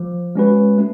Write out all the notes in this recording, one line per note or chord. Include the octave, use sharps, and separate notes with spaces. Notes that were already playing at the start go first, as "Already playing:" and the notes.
Already playing: F3
G#3 C#4 F#4 B4
A3